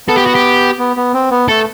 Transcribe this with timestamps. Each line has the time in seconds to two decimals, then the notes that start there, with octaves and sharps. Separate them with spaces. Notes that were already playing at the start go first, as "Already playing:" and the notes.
0.08 B3 A4
0.17 G4
0.26 F#4
0.35 G4
0.79 B3
0.97 B3
1.14 C4
1.31 B3
1.49 A3 A4